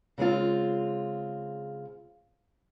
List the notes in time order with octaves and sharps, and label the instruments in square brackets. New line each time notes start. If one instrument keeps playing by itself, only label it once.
[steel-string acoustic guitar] C#3 G#3 C4 F4